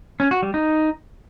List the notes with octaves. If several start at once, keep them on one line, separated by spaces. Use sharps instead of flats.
C#4
F#4
G3
D#4